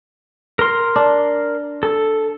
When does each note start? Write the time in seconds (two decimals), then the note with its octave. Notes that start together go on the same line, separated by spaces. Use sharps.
0.59 A#4 C6
0.96 D4
1.83 A4